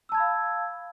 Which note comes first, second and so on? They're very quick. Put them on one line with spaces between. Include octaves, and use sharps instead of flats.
E6 A5 G#6 B5 F5